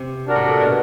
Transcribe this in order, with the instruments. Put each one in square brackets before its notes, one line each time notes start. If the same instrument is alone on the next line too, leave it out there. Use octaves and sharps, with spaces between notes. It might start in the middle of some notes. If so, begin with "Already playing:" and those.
Already playing: [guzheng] C3
[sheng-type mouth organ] D4 F#4 A#4
[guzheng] A2
A#2
B2